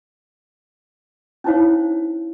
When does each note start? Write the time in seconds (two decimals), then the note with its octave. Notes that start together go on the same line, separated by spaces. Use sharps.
1.44 C#4 D#4 E4 C5 C#5 F5